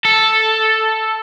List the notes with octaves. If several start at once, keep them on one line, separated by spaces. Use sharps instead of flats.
A4